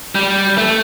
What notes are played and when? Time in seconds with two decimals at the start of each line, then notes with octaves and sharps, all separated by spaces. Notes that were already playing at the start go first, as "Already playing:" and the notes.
0.15 G3
0.58 A3